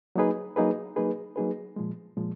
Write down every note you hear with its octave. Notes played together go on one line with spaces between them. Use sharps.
F#3 A#3 D#4 G#4 B4
F#3 A#3 D#4 G#4 B4
F#3 A#3 D#4 G#4 B4
F#3 A#3 D#4 G#4 B4
A#2 F3 G#3
A#2 F3 G#3